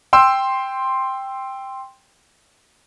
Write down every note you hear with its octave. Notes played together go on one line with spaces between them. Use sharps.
G5 C6 E6